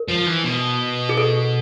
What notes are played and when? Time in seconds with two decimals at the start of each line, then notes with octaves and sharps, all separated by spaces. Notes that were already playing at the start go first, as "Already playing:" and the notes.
Already playing: A#4
0.08 F3
0.26 E3
0.44 B2
1.09 G#4
1.17 A4